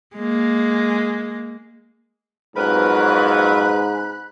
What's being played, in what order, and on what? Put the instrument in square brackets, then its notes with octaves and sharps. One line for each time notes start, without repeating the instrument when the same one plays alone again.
[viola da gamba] G#3 A#3
[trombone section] F2 F#3 [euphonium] G#2 [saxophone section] B3 A#4 B4 [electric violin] B5 F#6